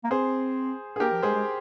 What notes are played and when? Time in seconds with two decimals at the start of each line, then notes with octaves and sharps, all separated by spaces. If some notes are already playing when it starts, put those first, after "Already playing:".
0.04 A#3
0.10 C4 G#4 C5
0.96 G#4
1.00 A#3 G4 A#4
1.12 F3
1.23 G#3 G#4 C5
1.34 G#3